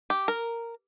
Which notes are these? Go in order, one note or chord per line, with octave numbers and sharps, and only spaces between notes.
G4
A#4